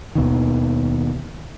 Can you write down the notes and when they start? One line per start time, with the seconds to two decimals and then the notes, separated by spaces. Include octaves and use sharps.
0.15 D#2 B2 D#3